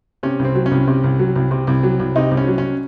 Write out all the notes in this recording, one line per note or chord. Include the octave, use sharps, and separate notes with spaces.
C3 C#4
C2
C4
F#3
C#4
C2
C3
C2
F#3
C2
C3
C2
F#3
C2
C3 D#4
C2
C#4
F#3
C#4